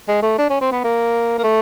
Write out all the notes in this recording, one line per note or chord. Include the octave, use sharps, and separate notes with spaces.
G#3
A3
D4
C#4
C4
B3
A#3
A#3
A3